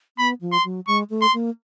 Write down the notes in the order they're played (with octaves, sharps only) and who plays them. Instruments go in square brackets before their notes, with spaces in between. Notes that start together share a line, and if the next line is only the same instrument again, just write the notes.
[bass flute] B3 [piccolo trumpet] B5
[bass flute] F3
[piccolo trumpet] C6
[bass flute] F#3
[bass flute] G#3 [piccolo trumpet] C#6
[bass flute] A3
[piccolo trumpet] C6
[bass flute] A#3